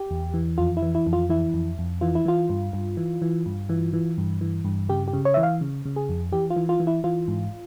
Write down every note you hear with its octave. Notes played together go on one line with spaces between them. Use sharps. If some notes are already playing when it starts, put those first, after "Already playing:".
Already playing: G4
E2
E3
F2 F4
E4
E3
E4
F2
F4
E3 E4
F2
F2
E3 F4
E4
E3 F4
G2
G2
E3
E3
G2
E3
E3
G2
E3
G2
C#3 G4
G4
C#3
C#5
E3 E5
F5
C#3
C#3
G#4
F2
E3 G4
F4
E3
F4
E3
E4
E3 F4
G#2